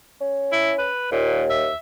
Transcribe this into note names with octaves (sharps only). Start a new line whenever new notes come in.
C#4
E4
B4
D#2 A#2
E5